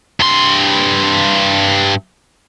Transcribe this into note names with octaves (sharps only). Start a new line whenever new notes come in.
G2 C6